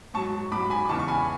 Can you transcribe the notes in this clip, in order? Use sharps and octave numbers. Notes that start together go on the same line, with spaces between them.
G#2 F#3 A5 C#6
G#2 F#3 B5 D6
G#5 B5
D6
E2 C#3 E3 A5 C#6
C#6
G#5 B5